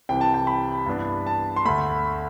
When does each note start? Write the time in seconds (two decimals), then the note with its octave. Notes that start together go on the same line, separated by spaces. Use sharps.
0.09 C2 C3 E3 G5
0.21 A5
0.34 G5
0.47 B5
0.86 G2 E3 B3 D4
1.27 A5
1.56 C6
1.65 D2 D3 A3 B5